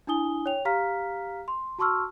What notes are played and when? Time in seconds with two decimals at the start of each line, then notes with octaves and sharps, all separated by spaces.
0.07 D4 E4 G#5 D#6 G7
0.46 C#5 G5 F7
0.65 G4 F5 A#5 F6 B6
1.48 C6
1.79 F#4 A5 C6 C#6 E6 F6